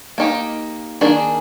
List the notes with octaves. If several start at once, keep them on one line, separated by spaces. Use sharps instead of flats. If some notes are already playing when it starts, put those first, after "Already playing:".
A#3 D#4 G4
D#3 A#3 D4 G#4